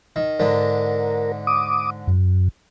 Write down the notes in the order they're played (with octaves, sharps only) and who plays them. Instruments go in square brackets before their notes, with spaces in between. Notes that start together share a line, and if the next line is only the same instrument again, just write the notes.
[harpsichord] D#3
[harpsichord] G#2 D3 D4 [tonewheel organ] A#4
[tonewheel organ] D6 D#6
F#2